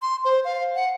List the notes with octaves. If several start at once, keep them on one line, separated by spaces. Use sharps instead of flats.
C6
C5
F5
F#5